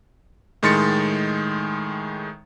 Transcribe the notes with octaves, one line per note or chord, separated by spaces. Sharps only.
A2 D#3 G#3 C6 A6 C#7